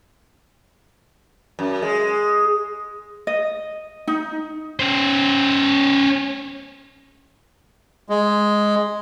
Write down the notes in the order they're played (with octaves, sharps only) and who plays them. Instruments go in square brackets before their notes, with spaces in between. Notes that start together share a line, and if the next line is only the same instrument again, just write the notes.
[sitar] F#2
G#3
[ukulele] D#5
D#4
[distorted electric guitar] C#4 C5
[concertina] G#3